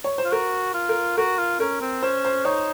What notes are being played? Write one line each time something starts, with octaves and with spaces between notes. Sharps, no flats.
C#5
C5
F4
F#4 A#4
F4
A#4
F#4 A#4
F4
C#4 A#4
C4
C#4 C5
C5
D#4 C#5